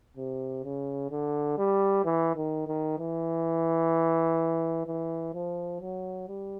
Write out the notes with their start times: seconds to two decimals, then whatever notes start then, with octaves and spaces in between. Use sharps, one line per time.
0.17 C3
0.64 C#3
1.11 D3
1.58 G3
2.05 E3
2.36 D#3
2.67 D#3
2.99 E3
4.87 E3
5.34 F3
5.81 F#3
6.28 G3